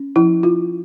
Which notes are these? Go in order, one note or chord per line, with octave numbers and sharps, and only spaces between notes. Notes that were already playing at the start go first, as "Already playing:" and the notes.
Already playing: C#4
F3 E4
E4 F4